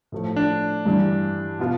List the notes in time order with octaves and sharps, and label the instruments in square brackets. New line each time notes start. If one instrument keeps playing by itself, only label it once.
[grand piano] A2 F3 A3
[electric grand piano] D4
[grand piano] G2 E3 G3 D4
B2 B3 F4